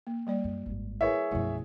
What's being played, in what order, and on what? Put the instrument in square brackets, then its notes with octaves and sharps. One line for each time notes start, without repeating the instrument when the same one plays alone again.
[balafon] A#3
G3 A#3 D5
[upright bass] F#2
G#1 F#2
[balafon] E4 A#4 B4 [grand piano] G#4 C#5 E5
[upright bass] B1 F#2 [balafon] F3 A3 E4